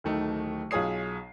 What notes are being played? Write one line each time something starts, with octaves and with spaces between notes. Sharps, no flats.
D1 D#3 A3 D#4
B1 F4 G#4 C#5 D#6 C7